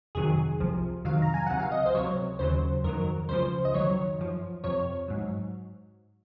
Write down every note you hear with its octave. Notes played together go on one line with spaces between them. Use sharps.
F2 C3 D#3 F#3 G#4
C2 C3 F3
F2 C3 D#3 F#3 F5
A#5
G#5
C#2 C3 F#3 F#5
F5
D#5
C5
C#2 C3 F#3 C#5
D#2 C#3 F#3 C5
F2 D#3 F#3 A#4
C#2 C#3 F3 C5
D#5
F2 D#3 F#3 C#5
F#2 F3
F2 C3 F3 C#5
G#2 F#3